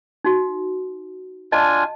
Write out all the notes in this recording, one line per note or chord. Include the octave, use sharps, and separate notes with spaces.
D#4 F#4
D4 F4 D#5 G#5 A5